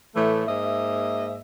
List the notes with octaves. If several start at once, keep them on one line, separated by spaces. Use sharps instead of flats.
A2 E3 A3
G#2 A#3 D#5 E5